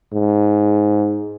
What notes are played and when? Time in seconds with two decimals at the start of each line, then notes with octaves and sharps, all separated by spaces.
0.13 G#2